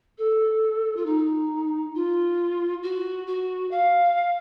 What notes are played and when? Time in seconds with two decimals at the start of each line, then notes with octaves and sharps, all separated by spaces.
0.18 A4
0.96 F4
1.05 D#4
1.94 F4
2.83 F#4
3.27 F#4
3.71 F5